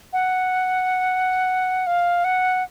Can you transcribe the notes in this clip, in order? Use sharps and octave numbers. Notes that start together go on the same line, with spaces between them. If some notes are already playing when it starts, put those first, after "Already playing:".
F#5
F5
F#5